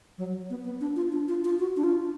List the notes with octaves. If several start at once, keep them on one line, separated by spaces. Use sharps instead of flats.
F#3
B3
B3
D4
F4
D4
F4
F4
F#4
D4
F4